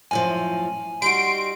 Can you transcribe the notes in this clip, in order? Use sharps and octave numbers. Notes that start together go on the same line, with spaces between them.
F#2 A2 F3 G#5
G3 D#4 F#4 C6 D7